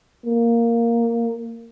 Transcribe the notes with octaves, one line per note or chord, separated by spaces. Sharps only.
A#3